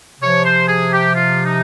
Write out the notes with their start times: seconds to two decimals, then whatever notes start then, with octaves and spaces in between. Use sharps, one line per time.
0.20 C3 F3 C#5
0.43 C5
0.66 G#4
0.90 G4
1.13 F4
1.44 D#4